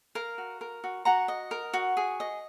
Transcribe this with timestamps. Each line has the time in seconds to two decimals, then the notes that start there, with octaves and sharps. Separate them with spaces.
0.15 A#4 F5
0.38 F#4
0.61 A#4
0.84 F#4
1.05 F#4 F#5 A#5
1.28 D#5
1.51 A#4
1.74 F#4
1.97 G#4
2.20 D#5